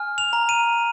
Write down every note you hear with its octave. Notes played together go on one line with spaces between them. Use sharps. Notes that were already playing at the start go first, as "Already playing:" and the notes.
Already playing: G#5 F6
F7
A#5
D#7